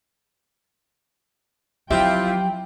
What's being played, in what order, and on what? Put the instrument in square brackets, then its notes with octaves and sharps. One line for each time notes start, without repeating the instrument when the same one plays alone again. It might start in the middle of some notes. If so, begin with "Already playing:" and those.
[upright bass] F3 F#3 [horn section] C4 E4 F4 [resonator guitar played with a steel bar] G4 E5 [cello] G5